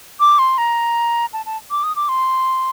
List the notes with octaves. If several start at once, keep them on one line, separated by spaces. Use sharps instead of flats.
D6
C6
A#5
A5
A5
D6
D#6
D6
C6